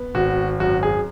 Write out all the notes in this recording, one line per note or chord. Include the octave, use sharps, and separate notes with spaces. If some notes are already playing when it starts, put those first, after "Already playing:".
Already playing: B3
G#1 F#4
F#2 F#4
G#4